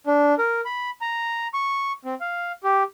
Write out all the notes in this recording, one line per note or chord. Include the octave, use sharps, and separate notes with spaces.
D4
A#4
B5
A#5
C#6
C4
F5
G4